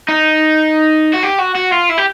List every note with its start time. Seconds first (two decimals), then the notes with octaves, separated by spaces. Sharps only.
0.08 D#4
1.14 F#4
1.23 G4
1.39 F#4
1.55 F#4
1.72 F4
1.89 E4
1.98 G4